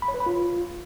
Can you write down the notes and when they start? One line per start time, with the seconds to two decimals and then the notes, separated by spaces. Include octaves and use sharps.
0.02 B5
0.08 C#5
0.14 B4
0.20 B5
0.26 F4